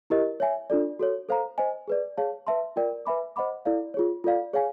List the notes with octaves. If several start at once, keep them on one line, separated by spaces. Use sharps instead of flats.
E4 G4 A#4 D#5
C#5 E5 G#5
D4 F4 A4 D5
F#4 A4 C#5
A4 C5 F5 A#5
C5 D#5 G#5
G#4 B4 D5
G#4 C#5 F5 A5
B4 E5 A5 C6
F4 A#4 D5 G5
B4 E5 G#5 B5 D6
C5 D#5 F#5 B5 D6
E4 A4 D5 F5
F4 G#4 C#5
F4 A4 D5 F5
G#4 C#5 F5 G#5